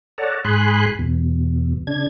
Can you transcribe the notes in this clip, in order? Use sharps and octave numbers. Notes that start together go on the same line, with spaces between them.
A4 C#5 D5 F#5 A5 A#5
G#2 G#4 G#5 B5 C6 F#6
E2 B2
C#3 D4 G#6